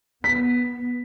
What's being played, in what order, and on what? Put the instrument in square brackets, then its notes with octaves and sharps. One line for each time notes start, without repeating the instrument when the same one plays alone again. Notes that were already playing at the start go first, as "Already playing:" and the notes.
[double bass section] B3 [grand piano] B6